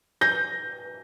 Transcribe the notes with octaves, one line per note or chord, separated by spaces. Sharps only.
G6 A#6